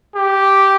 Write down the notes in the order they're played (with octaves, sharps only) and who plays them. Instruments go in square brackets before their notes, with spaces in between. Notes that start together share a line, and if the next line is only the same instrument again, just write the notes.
[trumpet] G4